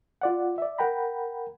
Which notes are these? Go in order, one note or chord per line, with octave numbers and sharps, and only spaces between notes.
F4 D5 F#5
D5 E5
A#4 F#5 G5 A#5 B5